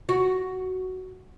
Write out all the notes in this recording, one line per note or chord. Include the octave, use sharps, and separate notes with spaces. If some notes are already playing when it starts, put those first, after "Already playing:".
F#4